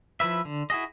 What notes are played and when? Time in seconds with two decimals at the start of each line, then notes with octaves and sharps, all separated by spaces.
0.20 F3 E4 B4 E5
0.45 D3
0.70 E4 F#4 G#4 D#5